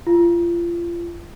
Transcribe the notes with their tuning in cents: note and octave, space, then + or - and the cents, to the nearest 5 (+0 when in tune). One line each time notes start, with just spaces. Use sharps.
F4 -30